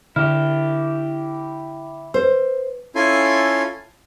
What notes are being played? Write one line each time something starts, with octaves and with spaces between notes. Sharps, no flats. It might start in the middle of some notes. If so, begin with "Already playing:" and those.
D3 E4 G4 F6
B4 C5
C#4 E4 F4 A4 G#5 C6